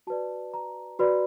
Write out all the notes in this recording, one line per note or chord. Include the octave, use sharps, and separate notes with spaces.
F#4 B4 D5 A5
A#5
F#4 B4 D5 B5